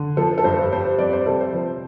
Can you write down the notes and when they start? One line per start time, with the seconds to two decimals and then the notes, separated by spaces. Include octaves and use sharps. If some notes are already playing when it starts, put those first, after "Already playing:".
Already playing: D3
0.17 F3 A4
0.38 A4
0.44 G2 C5
0.72 G3 C5
0.99 F2 D5
1.13 C5
1.26 C3 A4
1.40 C5
1.54 F3